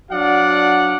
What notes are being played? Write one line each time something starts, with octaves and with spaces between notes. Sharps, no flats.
F#3 D4 F#4 D5 F5 F#5